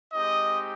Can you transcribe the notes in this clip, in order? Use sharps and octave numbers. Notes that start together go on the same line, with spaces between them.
G#3 C4 D#4 G4 D#5